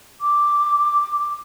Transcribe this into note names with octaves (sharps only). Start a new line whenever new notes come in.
D6